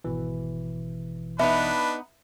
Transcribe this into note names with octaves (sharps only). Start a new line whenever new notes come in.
G#1 B2 E3
B3 D4 D#4 B4 E5